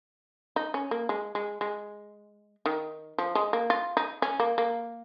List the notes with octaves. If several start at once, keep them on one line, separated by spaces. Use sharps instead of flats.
D#4
C#4
A#3
G#3
G#3
G#3
D#3
F3
G#3
A#3
F4
D#4
C#4
A#3
A#3